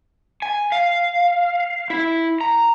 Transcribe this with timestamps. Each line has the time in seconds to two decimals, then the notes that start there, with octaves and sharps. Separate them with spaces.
0.42 G#5
0.72 F5
1.90 E4
2.41 A#5